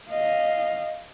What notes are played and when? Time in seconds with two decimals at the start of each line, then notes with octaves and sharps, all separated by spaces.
0.10 D#5 F5